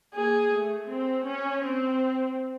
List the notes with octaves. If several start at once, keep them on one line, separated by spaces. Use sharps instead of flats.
A#3 G#4
A3
C4
C#4
C4